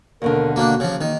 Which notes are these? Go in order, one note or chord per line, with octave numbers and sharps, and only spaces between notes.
D#2 B2 D3 A#4
A#3 D4 F#4
C#3 F3
D#3 A#3 D#4